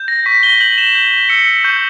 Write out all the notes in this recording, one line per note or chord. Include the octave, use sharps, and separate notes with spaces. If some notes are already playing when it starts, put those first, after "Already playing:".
Already playing: G6
A#6
C#6 B6
G7
G6 F#7
E7
G6
E6 C#7
C#6 G6